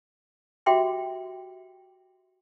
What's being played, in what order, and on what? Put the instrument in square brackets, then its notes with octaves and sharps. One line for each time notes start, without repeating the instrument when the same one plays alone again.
[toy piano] F#4 G4 E5 G5 C6 D6